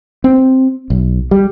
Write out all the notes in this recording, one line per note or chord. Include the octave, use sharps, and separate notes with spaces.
C4
B1
G3